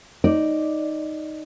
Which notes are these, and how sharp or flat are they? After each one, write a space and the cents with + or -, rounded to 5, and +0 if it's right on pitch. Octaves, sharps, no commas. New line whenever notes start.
D#4 +0 D5 +0